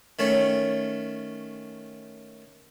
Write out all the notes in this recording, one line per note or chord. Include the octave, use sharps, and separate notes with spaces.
D#3 A3 C#4